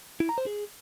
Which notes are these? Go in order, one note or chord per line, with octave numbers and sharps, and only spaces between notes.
E4
A#5
C5
G#4